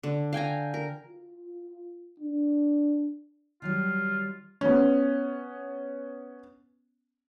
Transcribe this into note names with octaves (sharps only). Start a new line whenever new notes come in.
D3
F5 G5 G#5 A#5
A#4
F4
D4
D#3 F#3 G3 F4
B3 C#4